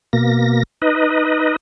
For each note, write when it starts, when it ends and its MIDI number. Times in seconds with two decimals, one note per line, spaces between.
0.13 0.63 47
0.13 0.63 58
0.13 0.63 94
0.82 1.56 63
0.82 1.56 71
0.82 1.56 75